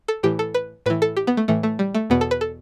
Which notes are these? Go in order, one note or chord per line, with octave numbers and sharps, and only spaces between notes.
A4
A2 E3 G4
A4
B4
A2 E3 B4
A4
G4
B3
A3
A2 E3 A3
A3
G3
A3
E2 B2 B3
A4
B4
A4